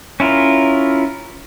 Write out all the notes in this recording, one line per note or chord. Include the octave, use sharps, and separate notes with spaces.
C#4 E4 F4 A#4